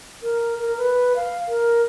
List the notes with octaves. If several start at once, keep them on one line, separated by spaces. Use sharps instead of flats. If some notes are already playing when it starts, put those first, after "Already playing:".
A#4
A#4
B4
F5
A#4